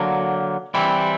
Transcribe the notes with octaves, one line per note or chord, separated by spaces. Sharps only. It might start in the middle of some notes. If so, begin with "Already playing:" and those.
Already playing: D3 F#3 A#3
E3 G3 C4 E4